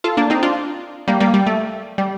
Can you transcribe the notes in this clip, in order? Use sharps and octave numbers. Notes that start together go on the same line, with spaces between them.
F4 A4
A#3 D4
C4 D#4
D4 F4
G3 A#3
G3 A#3
G3
A3
G3